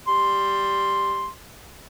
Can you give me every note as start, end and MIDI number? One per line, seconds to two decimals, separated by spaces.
0.08 1.28 55
0.08 1.28 84